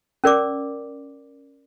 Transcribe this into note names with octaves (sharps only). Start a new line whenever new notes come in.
C#4 A#4 D5 D6